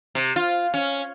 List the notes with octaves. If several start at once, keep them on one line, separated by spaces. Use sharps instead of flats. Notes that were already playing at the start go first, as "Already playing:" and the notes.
C3
F4
C#4